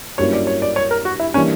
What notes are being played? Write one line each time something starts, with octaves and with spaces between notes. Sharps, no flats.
G2 F#3 A#3 C#4 E4 C#5
D5
C#5
D5
C#5
A#4
F#4
E4
E3 G3 A#3 C#4 D4